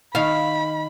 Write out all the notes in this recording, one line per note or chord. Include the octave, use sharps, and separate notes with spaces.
D#3 F5 B5